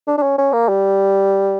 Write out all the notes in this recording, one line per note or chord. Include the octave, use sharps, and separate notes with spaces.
D4
D4
C#4
C#4
A#3
G3